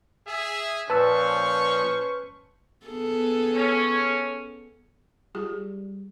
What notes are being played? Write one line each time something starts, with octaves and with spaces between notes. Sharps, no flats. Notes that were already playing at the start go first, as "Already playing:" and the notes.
G#4 E5
A#2 F3 C#4 B4 C5 A5 C#6 E6
B3 G#4 A4
C#4
G3 F4 G#4